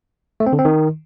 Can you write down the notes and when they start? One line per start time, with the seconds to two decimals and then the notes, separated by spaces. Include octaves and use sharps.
0.40 A3
0.46 C4
0.53 D3
0.59 C4
0.65 D#3